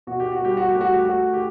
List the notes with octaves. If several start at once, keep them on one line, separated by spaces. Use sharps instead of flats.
B2 F#4
G4
F#4
G3 G4
F#4
G4
A3
F#4
G4
A3 F#4
G4